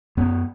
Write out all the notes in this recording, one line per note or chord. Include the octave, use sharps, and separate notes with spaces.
F#2 B3